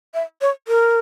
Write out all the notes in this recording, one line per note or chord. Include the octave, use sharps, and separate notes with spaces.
E5
C#5
A#4